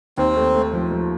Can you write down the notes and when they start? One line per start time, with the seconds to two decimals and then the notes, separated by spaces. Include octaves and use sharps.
0.18 D#2 C4
0.36 A3
0.55 A3
0.73 F3
0.92 F3